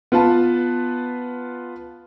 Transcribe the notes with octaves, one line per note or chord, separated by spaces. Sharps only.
B3 F4 B4 A5